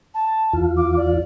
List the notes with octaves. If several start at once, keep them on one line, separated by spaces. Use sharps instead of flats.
A5
E2 F4
D6
D5